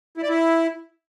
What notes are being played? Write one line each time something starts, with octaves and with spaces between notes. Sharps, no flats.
E4
D5
E4